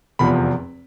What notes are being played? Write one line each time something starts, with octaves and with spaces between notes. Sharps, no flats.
F1 E2 C3 F3 B5